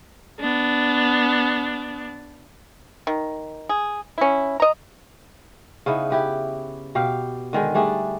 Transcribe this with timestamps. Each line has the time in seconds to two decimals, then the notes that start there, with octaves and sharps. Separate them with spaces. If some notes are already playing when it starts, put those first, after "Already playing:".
0.40 B3 D4
3.07 D#3
3.69 G#4
4.18 C#4 E4
4.60 D#5 A#5
5.86 C#3 B3 D#4 E4
6.10 E4 G4 B4
6.95 B2 G4 F5 G5
7.53 D3 D#3 G#3
7.74 G3 A3 D4 G#4